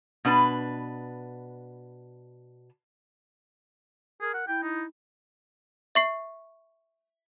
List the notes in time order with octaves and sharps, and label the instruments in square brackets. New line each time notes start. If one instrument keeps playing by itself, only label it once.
[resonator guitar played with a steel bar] B2 D4 B4
[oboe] G#4 [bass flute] A#4
[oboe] F#5
[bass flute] E4 [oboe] G5
[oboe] D#4
[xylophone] E5 C#6 C7